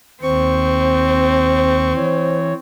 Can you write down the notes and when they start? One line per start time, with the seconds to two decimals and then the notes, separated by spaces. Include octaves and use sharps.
0.22 D#2 C4 C5 C#6
1.95 E3 C#5